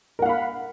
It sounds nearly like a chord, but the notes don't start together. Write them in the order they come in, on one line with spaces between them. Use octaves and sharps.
A#4 F#5 F5 B5